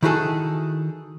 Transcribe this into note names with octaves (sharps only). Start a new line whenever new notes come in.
D#3 E4 F#4 G#4 A4